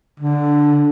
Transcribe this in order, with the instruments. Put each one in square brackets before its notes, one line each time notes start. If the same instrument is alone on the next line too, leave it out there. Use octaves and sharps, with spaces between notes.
[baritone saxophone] D3